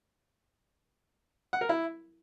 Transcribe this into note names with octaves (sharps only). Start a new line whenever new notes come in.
F#5
A#4
E4